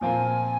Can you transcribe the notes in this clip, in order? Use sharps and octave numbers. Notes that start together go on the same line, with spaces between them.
A#2 F3 C4 F4 A#4 G#5